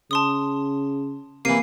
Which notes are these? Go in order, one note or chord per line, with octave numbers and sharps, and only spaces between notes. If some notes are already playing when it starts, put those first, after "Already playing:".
C#3 A5 C6 D#6
C3 E3 A#3 C7 D#7